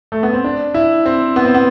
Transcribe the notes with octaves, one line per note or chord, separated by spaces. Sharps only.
A3
B3
C4
D4
E4
C4
B3
C4
B3